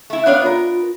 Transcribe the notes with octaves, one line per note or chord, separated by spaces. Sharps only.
A3 E4
B3 D4 C#5 F5
B3 F4 A#4